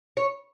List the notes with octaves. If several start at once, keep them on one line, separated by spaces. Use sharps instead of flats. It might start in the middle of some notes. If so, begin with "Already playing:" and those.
C#5